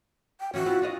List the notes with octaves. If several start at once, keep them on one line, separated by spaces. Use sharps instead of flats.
G5
E3 F3 C#4 F#4
C4 E4 F4
D4 F4 D#5